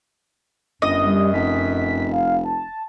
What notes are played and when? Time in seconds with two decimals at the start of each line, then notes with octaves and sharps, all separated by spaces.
0.82 G1 F#2 D#5
1.04 G3
1.34 F1 B6
2.12 F5
2.45 A5